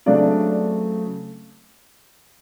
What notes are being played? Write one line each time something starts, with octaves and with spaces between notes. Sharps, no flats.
C#3 F#3 A3 C4 D4 D5